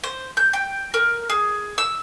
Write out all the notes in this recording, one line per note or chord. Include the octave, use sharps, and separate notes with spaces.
C5
G6
G5
A#4
G#4
E6